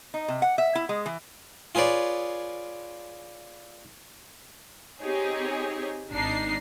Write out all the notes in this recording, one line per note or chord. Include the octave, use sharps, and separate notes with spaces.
D#4
C3
F#5
E5
E4
G#3
E3
F4 G#4 B4 C#5 D5
C4 D#4 G4 G#4 C#5
G#1 D4 D#4 C7